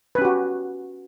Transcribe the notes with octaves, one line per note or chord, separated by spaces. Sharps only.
C#4 F#4 G4 B4